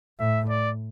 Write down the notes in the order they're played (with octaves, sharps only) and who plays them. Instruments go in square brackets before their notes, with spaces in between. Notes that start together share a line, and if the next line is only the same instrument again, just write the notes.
[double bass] A2 [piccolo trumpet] E5
[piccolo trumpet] D5